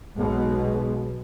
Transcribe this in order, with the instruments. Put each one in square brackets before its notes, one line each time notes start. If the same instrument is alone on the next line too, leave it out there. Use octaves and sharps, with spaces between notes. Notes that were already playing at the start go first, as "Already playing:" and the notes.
[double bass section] B1 B2 [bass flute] G#3